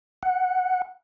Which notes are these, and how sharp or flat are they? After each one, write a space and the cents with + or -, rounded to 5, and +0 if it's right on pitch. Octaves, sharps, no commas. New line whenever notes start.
F#5 +0